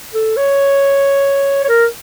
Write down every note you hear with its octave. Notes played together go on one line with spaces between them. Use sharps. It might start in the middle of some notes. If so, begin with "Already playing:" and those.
A4
C#5
C#5
A#4